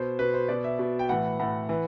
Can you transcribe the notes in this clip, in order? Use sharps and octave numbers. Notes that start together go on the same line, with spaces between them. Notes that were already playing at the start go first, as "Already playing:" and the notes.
Already playing: B2 C5
B2 B4
C5
B2 D5
E5
B2
G5
A2 E3 F#5
A2 E3 F#5
E3